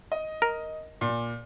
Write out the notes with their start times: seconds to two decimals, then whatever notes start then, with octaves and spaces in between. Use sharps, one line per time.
0.12 D#5
0.42 A#4
1.01 A#2